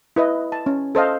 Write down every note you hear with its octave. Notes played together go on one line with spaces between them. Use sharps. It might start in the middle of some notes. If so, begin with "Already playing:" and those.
E4 B4 D#5
A5
C#4
A4 C5 D#5 F5